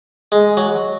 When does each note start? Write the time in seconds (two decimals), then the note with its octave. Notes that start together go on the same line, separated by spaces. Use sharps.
0.32 G#3
0.57 F#3